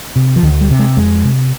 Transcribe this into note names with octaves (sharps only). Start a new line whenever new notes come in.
C3
F3
D2 D#3
G3
C3
G#3
F2 G#3
C3